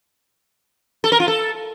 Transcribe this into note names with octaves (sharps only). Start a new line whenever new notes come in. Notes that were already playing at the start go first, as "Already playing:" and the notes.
A4
A#4
F4
A4